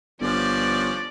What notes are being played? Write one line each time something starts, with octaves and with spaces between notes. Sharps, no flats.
G1 F3 C#4 D4 D5